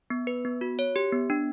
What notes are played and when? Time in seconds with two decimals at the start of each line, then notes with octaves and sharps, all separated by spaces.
0.10 B3
0.27 B4
0.45 B3
0.61 F#4
0.79 C#5
0.96 G4
1.12 B3
1.30 D4